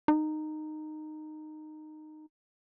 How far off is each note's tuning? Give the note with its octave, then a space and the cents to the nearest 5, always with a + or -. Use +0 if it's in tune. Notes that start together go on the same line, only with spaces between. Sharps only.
D#4 -15